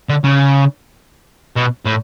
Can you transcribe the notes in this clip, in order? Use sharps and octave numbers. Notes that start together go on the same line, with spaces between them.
D3
C#3
B2
A2